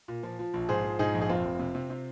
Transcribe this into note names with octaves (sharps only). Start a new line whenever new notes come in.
A#2
F3
F3
A#1
G#2 G#4 C5
F3
G#2 D#4 G#4
A#1
G#4
F1 C4 F4
F1
C3
C3
C3